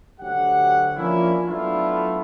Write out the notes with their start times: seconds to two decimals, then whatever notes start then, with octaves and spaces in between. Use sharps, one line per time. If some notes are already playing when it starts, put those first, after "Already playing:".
0.20 D2 F#3 G4 F#5
0.97 F3 A#3 C#4 D4 E4
1.48 F#3 A3 B3 D4 E4 F4